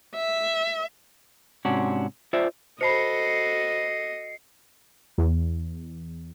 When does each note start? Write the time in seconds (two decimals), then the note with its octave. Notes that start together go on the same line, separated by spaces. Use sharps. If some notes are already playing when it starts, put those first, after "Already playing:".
0.15 E5
1.65 G#2 C3 C#4 D4 F#4
2.33 F4 C5 D5 E5
2.81 F#4 A4 C5 D#5 A5 B5 C7 C#7
5.18 E2